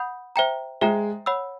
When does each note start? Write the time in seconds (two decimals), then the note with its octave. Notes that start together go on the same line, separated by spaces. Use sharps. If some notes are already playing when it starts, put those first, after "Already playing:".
Already playing: F#5 B5 D#6 G6
0.36 C5 E5 G5 A#5
0.81 G#3 C5 E5 G5 A#5
1.26 C#5 F#5 B5 E6